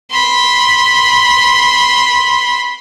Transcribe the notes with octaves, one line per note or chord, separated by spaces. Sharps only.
B5 C6